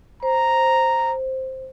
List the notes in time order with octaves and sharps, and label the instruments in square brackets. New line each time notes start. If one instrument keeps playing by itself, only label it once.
[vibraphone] C5 [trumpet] A#5